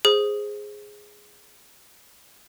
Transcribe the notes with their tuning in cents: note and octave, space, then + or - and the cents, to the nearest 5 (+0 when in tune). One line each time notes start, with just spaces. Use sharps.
G#4 +0 C5 +0